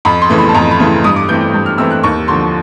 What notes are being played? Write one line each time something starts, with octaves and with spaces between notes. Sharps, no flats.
F2 B5
C6
C#3 E3 A3
B5
A5
F2 A#5
B5
C#3 E3 A3
G2 D#6
D6
E3 A3 C4 G6
G2
F6
E3 A3 C4 E6
F#6
D#2 C#6
D3 F3 C6